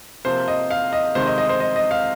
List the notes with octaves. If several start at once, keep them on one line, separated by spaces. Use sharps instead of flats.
C3 F3 A#3 C5
D#5
F5
D#5
C3 D#3 G#3 C4 C5
D#5
D#5
C5
D#5
D#5
F5